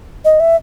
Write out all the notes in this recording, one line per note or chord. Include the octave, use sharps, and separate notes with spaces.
D#5
E5